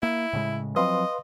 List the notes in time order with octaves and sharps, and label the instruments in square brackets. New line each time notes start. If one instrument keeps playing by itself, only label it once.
[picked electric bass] A#3 [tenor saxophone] E4
[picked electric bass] A2 C#3 G#3
[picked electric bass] F3 F#3 C4 [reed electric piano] B4 F5 C6 [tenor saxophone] D#5